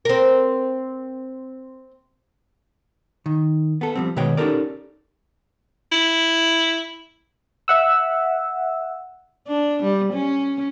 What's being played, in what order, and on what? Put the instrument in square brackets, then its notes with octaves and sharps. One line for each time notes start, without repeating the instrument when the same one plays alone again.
[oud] C4 A#4
[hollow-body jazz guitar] D#3
B3 A4
F3 G3 C4
B2 D#3 G#3 B4 C#5 G5
C#4 D#4 G4 A4 A#4 D5
[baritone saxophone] E4
[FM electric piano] E5 F#5 E6
[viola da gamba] D4
G3
C#4